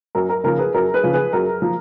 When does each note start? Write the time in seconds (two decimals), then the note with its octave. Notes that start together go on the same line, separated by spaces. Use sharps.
0.15 F#2 A#4
0.29 A#4
0.44 C#3 F3 A#4
0.59 G#4 B4
0.74 F#2 A#4
0.94 G#4 B4
1.03 C#3 F3
1.13 G#4 B4
1.33 F#2 A#4
1.62 F3